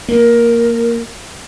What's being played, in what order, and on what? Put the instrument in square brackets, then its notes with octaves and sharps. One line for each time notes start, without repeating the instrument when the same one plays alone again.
[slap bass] A#3 [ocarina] A#4